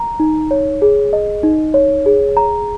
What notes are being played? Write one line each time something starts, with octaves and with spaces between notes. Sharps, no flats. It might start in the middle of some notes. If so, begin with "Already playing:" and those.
Already playing: A#5
D#4
C#5
G#4
D#5
D#4
C#5
G#4
A#5